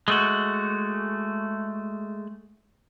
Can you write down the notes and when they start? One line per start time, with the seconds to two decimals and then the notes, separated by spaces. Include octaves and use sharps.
0.08 G#3 A3 F#4